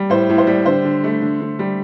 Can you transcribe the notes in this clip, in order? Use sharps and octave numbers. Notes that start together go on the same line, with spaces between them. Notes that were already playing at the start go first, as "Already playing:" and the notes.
Already playing: G3
A2 C5
A2
C5
G3
D3 C5
D3
A3
D3
D3
G3